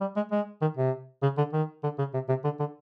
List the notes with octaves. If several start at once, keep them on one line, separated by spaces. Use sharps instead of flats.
G3
G#3
G#3
D#3
C3
C#3
D3
D#3
D3
C#3
C3
C3
D3
D3